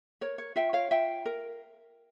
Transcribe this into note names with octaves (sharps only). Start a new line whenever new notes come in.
A#4 C#5
C#5
F4 E5 G5
C#5 F5
F4 E5 G5
A#4